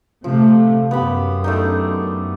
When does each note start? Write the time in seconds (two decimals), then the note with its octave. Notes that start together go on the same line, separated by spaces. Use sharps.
0.24 C3 F3 A3
0.91 F#2 B3 G4 B5
1.44 A3 D4 D#4